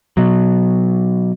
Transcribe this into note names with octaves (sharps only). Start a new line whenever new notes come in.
B2 F#3